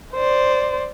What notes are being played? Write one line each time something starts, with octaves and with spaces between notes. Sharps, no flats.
C5 D5